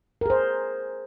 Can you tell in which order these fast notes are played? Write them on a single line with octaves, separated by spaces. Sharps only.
A#4 G#4 C5